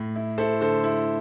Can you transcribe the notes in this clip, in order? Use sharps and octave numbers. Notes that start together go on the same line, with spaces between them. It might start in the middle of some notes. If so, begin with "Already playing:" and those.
Already playing: A2
E4
E4 A4 C5
D3 A4 C5
E4